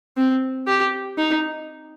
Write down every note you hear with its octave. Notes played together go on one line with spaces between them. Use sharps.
C4
G4
D#4